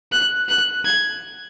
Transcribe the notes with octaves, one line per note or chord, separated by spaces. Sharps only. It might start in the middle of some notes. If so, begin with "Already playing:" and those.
F#6
F#6
G#6